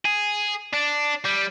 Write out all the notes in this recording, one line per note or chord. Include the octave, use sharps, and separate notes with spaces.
G#4
D4
G3